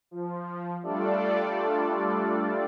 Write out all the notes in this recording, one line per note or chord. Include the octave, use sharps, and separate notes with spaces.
F3
G3 A3 D4 F4 A4 D5